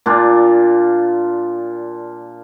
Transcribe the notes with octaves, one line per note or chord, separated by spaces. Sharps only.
A#2 D4 F4